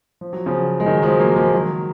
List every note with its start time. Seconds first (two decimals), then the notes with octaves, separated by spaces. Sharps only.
0.21 F3
0.33 F#3
0.46 C#3 F3
0.80 G#3
0.86 D#3 F#3
1.03 F3 G#3
1.20 F#3 A#3
1.36 F3 G#3
1.53 D#3 F#3